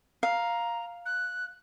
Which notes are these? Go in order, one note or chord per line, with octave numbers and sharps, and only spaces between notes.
F5 A#5
F#6